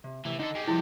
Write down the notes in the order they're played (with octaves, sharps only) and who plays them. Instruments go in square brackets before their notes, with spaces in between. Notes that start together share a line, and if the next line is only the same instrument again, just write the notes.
[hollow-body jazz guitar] C3
[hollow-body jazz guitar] A2 C3 [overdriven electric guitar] E3
[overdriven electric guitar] D3 A4 [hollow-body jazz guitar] D#4
[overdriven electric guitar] G#3 G4
[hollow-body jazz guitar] C2 F3 [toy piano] E4